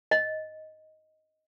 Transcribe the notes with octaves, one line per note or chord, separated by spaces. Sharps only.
D#5